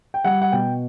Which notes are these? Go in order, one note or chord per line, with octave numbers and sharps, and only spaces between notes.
G5
G3 F#5
F#5
B2 G5